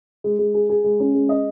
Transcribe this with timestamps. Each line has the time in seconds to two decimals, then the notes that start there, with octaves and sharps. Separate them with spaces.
0.24 G#3
0.39 G#3
0.54 G#4
0.69 G#4
0.84 G#3
1.00 C#4
1.14 G#3
1.29 D#5